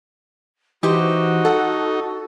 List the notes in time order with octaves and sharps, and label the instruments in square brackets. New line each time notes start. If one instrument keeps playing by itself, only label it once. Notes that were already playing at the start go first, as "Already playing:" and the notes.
[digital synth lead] E3 [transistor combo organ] D#4 [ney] F#4 [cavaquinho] G4 C5
[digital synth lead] A4 [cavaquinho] F#5